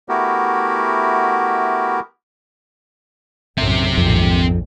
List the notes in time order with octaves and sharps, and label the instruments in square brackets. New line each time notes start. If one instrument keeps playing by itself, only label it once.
[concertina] A3 B3 E4 F#4 G4 A#4
[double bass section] B1 F#2 A2 [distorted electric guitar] C4 E5
[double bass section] A#1 G#2 D#3 [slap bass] F2